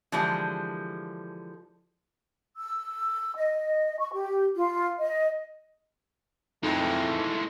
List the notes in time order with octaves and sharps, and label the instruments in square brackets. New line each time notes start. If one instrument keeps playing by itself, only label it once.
[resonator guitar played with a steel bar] D3 E3 F3 G3 G#3
[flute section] E6
D#5
C#6
G4
F4
D#5
[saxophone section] F2 [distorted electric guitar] E3 G#3 [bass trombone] A3 [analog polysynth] D#4